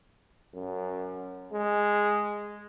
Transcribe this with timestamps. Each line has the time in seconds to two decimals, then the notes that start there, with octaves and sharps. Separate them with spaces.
0.54 F#2
1.53 G#3